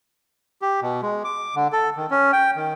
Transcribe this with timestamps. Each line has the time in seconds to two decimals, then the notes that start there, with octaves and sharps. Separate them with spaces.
0.62 G4
0.82 B2
1.02 G#3
1.24 D6
1.55 D3
1.73 A4
1.96 D#3
2.11 C#4
2.33 G5
2.56 D#3